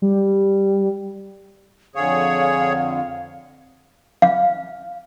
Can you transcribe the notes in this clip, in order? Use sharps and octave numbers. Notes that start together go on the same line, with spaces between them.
G3
F2 D3 G#4 C#5 F5
F5